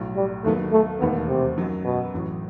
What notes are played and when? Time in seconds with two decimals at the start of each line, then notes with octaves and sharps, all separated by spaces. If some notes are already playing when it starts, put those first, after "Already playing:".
Already playing: B1 A2 F#3
0.16 G3
0.44 D#2 D#3 F#3 A3 B3
0.72 A3
1.00 E1 D#2 D#3 A3 B3
1.28 C3
1.58 F#2 D#3 F#3
1.85 B2
2.14 A1 A2 F#3